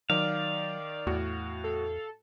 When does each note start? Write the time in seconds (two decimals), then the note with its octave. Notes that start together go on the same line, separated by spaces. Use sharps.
0.10 D#3 F#3 D5 F5
1.07 E2 A2 F#4
1.64 A4